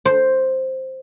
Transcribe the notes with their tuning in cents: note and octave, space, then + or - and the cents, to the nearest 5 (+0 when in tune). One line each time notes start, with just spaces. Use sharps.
C5 +5